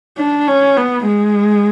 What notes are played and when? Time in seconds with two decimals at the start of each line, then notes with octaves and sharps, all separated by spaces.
0.18 D4
0.47 C#4
0.77 B3
1.06 G#3